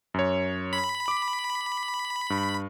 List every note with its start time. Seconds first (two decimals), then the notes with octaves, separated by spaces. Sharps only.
0.14 F#2 C#5
0.73 B5
1.08 D6
2.30 G2